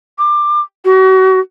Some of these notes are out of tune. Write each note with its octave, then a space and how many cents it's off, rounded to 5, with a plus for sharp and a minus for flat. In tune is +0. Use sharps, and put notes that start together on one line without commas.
D6 +25
F#4 +35